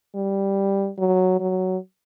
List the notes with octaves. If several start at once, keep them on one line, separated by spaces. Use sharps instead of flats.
G3
F#3
F#3